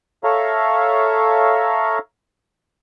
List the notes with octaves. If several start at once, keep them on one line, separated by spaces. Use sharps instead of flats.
A4 C#5 E5 F5 A#5